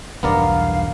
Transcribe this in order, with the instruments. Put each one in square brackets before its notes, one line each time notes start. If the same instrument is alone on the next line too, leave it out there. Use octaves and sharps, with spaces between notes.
[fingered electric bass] B1 E2 G2 [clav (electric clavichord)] B3 A#4 D5 [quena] F5